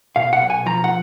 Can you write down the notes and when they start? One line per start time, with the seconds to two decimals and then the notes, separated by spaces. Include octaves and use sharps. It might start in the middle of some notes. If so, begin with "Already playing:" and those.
0.16 B2 F5
0.33 F#5
0.41 B1
0.50 G#5
0.66 F3 A#5
0.84 F#5